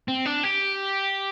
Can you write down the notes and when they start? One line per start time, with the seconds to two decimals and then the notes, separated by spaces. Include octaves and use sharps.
0.08 C4
0.26 D4
0.44 G4